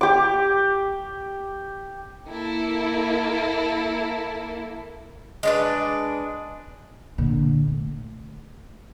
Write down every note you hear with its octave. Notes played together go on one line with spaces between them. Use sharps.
G4 D6
A#3 E4 A4
G#3 D4 B4
A#2 D3
A3